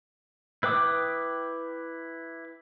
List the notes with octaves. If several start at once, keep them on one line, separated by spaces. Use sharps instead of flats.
E4 B4 G5 D6 D#6